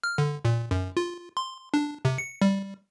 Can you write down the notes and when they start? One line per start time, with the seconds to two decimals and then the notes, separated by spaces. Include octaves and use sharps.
0.04 F6
0.18 D3
0.45 A#2
0.71 F#2
0.97 F4
1.37 C6
1.74 D4
2.05 C3
2.18 C#7
2.42 G3